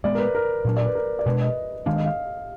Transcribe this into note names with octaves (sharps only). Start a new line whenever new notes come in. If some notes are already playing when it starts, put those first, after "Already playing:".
A#2 G#3 B3 D5
A#4
B4
A#4
A#2 F#3 D4
D5
B4
A#4
D5
B2 G#3 D4 B4
D#5
D#3 G#3 D4 F5
D#5
F5